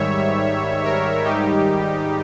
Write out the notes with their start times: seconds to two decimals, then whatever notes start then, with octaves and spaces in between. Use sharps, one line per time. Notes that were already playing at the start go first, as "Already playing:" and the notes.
Already playing: G#2 D#3 G3 C#5 E5
0.84 A#4 C#5
1.24 G#2 D#3 G3 D#4 G4